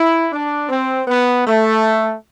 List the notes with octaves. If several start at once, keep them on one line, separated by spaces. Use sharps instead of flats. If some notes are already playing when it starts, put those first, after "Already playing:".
Already playing: E4
D4
C4
B3
A3